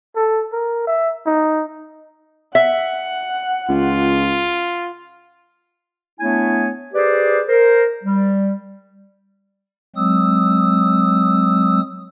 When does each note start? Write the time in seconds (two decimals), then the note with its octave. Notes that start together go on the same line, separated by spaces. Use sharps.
0.16 A4
0.53 A#4
0.87 E5
1.26 D#4
2.55 E5 F#5
3.69 C#2 F4
6.20 A3 B3 D4 E4 C#5 G#5
6.93 G4 G#4 B4 C5 D5
7.48 A#4 C5
8.04 G3
9.96 F#3 G#3 C4 D#6 E6